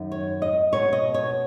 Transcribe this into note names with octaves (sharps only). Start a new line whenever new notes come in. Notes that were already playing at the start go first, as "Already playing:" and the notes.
Already playing: F#2 D#3
C#5
D#5
B2 B3 C#5
D#5
C#5